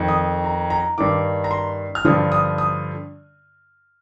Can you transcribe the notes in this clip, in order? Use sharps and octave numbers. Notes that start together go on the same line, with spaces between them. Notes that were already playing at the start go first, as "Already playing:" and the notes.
Already playing: F2 D#3
D#6
A#5
A#5
G2 D#3 D6
A#5
C6
F6
G2 D3 F3 D#6
D#6
D#6